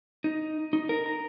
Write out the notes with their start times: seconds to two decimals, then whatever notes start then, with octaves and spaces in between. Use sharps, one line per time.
0.24 D#4
0.73 D#4
0.89 A#4
1.06 A#5